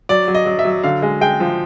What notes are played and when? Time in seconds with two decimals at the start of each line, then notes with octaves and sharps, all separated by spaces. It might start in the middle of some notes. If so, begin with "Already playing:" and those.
0.09 F#3 D5
0.28 F#3
0.35 D#5
0.46 F#3
0.59 E5
0.65 F#3
0.83 D3 F5
1.03 G#3
1.21 G#3 G5
1.40 F3